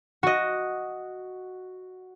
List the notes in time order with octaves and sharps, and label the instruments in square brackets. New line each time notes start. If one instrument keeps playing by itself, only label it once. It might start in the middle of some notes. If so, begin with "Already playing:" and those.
[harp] F#4 D#5